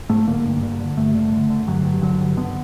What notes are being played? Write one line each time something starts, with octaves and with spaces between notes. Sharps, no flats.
G#2 A3
D3 A#3
G2
D3
D3
G2 A3
D3
D3
D3
G2 F#3
G2
D3 F#3
G2
D3 B3